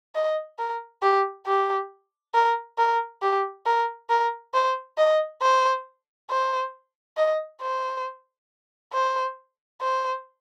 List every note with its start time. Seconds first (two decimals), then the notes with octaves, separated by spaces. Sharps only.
0.15 D#5
0.58 A#4
1.02 G4
1.46 G4
2.34 A#4
2.78 A#4
3.22 G4
3.66 A#4
4.09 A#4
4.54 C5
4.97 D#5
5.42 C5
6.30 C5
7.17 D#5
7.61 C5
8.93 C5
9.81 C5